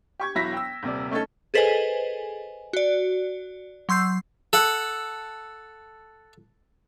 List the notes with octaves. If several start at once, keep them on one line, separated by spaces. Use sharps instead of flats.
G4 C#6 G#6
E1 F#3 E4 A#6 B6
G5 E6
D#1 C3 D5
A3 C#4 D#4 A4
G#4 A4 B4 C5 D#5 G#5
F#4 D5
F#3 C6 E6 G6 C7
A4 F#5